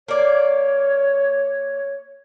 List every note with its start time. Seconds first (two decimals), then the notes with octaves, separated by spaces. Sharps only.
0.08 A#3 C#5 D5